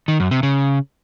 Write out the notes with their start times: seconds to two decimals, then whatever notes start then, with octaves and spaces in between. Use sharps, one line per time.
0.08 D#3
0.20 F#2
0.31 C3
0.43 C#3